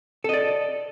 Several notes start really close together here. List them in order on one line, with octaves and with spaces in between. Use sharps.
A4 D#5 D5